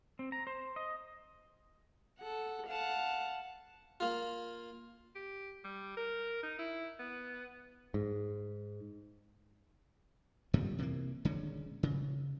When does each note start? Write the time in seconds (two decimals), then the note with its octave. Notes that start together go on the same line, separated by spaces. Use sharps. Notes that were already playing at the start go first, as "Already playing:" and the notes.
0.19 C4
0.32 A#5
0.47 C5
0.76 D#5
2.19 A4 F#5
2.67 F5 F#5 A5
4.00 A#3 F4
5.15 G4
5.64 G3
5.97 A#4
6.43 D#4
6.59 E4
6.99 B3
7.94 G#2
10.53 F2 A#2 F3 G3
10.78 C3 E3 G#3 A#3
11.25 D#1 D3 G#3 C#4
11.83 C#3